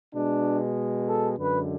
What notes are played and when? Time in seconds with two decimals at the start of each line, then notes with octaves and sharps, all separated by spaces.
0.14 B2 G#3 D4
1.07 A4
1.37 F#2 D3 G#3 B4